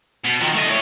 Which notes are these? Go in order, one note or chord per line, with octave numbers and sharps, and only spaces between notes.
B2
D#3 F3
A3 D#5
E4 C#5